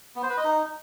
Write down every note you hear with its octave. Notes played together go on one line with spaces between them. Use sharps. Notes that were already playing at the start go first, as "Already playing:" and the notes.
B3
C5
B4
D#5
D#4